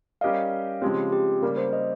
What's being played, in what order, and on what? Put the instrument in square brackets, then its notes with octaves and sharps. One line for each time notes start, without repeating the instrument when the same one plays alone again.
[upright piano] G3 C#4 G4 A#4 D#5 [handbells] F5
[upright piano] C#3 F3 G#3 C4 [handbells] G4
[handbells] G4
[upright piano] C#3 G3 A#3 [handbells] A#4
[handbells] C5
D#5